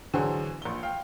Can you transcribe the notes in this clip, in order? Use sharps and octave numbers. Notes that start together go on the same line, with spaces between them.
D3 E3 F#3 F#4 G#4 C5
A#1 G7
F5 G5